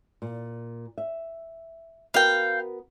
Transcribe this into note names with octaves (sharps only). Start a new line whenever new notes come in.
A#2
E5
B3 F#4 A#4 F5 G5